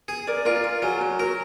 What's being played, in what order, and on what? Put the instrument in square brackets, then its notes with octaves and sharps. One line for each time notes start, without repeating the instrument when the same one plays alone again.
[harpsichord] G#4
[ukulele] A#4 D5
[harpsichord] F4 [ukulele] A#4 D5
[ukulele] A#4
[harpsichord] F#3 [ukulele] G#4
[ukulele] F#4
[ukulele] F#4 [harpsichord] A#4